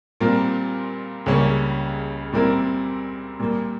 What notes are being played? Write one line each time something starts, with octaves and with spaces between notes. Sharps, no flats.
A#2 G3 C4 F4 A#4
C#2 C#3 G3 A#3 C#4
A#2 G3 C4 E4 A#4
A#2 G3 A#3